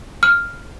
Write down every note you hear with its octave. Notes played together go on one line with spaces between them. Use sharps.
F6